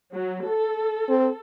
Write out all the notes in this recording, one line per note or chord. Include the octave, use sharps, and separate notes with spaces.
F#3
A4
C4